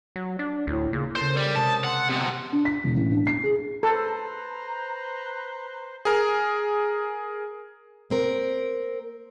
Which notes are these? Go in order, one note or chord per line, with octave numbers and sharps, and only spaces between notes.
F#3
D4
D2 A2
A#2 C#3
C#3 A4 A#4 C5
G3
C3 G#3 A5 D#6
F#5 A5 C6 E6
C3 B3
D4
B6
E1
A1
D4
C7
G#4
A4 B4 C5 A#5
G#4 A#4
A#3 C4 A#4